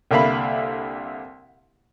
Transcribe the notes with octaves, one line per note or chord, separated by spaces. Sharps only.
C2 D3 A#3 E5 F5 B5